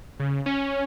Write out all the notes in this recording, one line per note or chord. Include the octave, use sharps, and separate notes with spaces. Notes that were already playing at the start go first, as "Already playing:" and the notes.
C#3
C#4